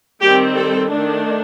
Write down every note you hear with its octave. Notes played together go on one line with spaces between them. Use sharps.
D#3 G3 C4 G4
A4
D#3 A3 D4